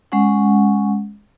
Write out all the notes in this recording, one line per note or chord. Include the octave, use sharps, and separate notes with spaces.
G#3 C#4 F#5